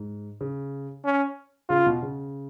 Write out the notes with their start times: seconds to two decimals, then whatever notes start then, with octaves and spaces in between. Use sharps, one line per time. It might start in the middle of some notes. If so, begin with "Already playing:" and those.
Already playing: G#2
0.41 C#3
1.05 C#4
1.69 C#3 F4
1.86 B2
2.02 C#3